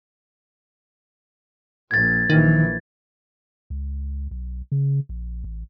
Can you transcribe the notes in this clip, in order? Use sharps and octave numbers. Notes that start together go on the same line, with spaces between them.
A#1 G#6 A6
A#1 D#3 E3
C#2
B1
C#3
A#1
A1